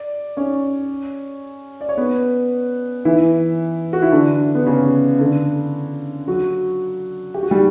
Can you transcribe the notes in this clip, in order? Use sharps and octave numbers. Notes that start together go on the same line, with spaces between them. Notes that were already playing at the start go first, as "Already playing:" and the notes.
Already playing: D5
C#4 C#5
D5
C#5
B3 B4
E3 E4
F#4
E4
D3 D4
B3
C#3 C#4
D3 D4
F#3 F#4
G4
F#4
G3 G4